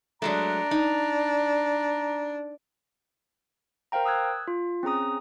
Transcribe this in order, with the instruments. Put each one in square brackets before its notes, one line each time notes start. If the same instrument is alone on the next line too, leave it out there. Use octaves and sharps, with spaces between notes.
[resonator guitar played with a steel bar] F#3 G#3 A3 [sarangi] D4 [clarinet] A#5
[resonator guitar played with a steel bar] D#4
[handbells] A#4 C5 F5 G5 A#5
D#6 E6 F#6 G#6
F4
C4 C#4 G#4 A#5 D#6